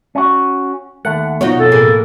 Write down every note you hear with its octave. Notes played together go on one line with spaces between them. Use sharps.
C#4 F#4
D#2 A3 F#5
B2 F3 D#4 F#4 C#5
F2 A4
A2 A#3 G#4